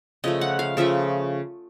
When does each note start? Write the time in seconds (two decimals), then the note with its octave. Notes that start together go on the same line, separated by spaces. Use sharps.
0.24 C#3 F3 A3 D#5
0.41 F#5
0.59 F5
0.77 C#3 F3 A3 E5